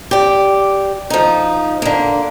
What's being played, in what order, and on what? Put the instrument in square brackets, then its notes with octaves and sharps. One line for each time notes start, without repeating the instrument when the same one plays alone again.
[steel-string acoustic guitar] G4 D5
F3 D#4
D3 A#3